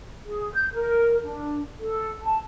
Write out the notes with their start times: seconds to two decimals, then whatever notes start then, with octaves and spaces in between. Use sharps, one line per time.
0.23 G#4
0.53 G6
0.73 A#4
1.24 D4
1.79 A4
2.22 A5